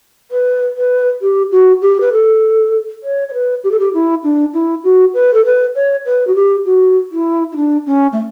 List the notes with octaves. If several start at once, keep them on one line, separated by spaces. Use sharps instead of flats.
B4
B4
G4
F#4
G4
B4
A4
C#5
C#5
B4
G4
A4
G4
E4
D4
E4
F#4
B4
A4
B4
C#5
B4
F#4
G4
F#4
E4
E4
D4
C#4
A3